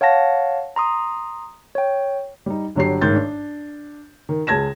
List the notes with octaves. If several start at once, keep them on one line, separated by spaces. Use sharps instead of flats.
C#5 F5 F#5 A5 A#6
A#5 C6 D#6
C#5 G5
G3 D#4
G1 D3 F#3 D4 G4 C7
A1 G#2 D#3 G6 A6
D4
D#3
C#2 G#3 A5 G#6 A#6 E7